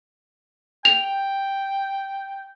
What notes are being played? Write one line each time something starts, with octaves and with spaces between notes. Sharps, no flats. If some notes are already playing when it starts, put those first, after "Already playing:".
G5 F7